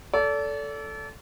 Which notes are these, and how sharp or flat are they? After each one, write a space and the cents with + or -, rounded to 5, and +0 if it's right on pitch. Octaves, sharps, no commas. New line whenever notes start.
A4 +0 D5 -35